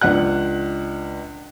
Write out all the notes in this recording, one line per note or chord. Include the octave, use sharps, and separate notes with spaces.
C#2 D4 F#5 F#6